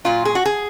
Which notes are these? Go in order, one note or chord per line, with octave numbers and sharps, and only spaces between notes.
A#2 F#3 F4
G#4
F#4
G#4